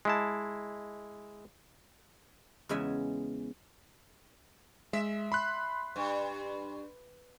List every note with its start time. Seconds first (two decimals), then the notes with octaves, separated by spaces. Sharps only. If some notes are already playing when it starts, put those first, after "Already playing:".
0.05 G#3 E4 A5
2.69 E2 C#3 G#3 E5 G#5
4.93 G#3 E5
5.32 B5 C6 F#6
5.96 G2